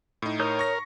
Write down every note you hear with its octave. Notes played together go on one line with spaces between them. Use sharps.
A2 D#4
A#4 C#5 D#6 G6
C#6 A#6